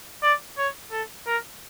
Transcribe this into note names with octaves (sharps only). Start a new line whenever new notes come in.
D5
C#5
A4
A#4